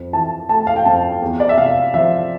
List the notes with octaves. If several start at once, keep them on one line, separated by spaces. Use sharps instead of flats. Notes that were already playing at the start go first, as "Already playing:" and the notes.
Already playing: F2
E3 A5
A3 A5
F5
G5
F2 A5
E2
D5
E5
C3 F5
F3 E5